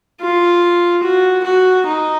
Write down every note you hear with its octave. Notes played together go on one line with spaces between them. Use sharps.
F4
F#4
F#4
D#4